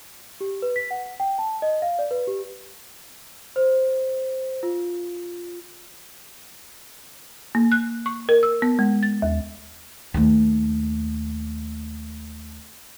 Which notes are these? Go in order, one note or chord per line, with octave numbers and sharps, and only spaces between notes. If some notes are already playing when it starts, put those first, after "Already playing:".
G4
B4
B6
F#5
G5
A5
D#5
F5
D5
B4
G4
C5
F4
A#3
F#6
C#6
A#4
E6
B3
G#3
A6
D#2
D#2 A3